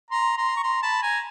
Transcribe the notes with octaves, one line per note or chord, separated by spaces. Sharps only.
A#5 C6
A#5 C6
C#6
A#5 C6
A5 B5
G#5 A#5